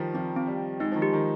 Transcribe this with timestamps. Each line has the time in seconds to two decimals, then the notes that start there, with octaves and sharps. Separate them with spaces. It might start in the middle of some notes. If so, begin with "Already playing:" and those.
Already playing: D#3 F3 G3
0.14 F3 C4
0.36 C4
0.47 G3
0.58 C4
0.80 G#3 D#4
0.92 F3
0.96 D#3
1.02 G4
1.13 D#3